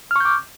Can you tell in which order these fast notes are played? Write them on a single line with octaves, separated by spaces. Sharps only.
F6 C#6 G6 D6